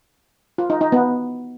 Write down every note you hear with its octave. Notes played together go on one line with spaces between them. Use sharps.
F4
D#4
D#4
B3